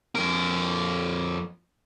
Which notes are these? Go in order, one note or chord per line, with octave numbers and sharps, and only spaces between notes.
F2 A#4